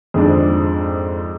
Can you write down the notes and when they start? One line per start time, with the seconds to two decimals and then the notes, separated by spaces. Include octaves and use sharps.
0.14 F2 G#2 G#3 C4 D4